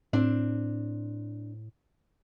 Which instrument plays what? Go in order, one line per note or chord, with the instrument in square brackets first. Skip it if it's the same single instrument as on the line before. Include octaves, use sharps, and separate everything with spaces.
[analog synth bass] A2 [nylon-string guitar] C4 D4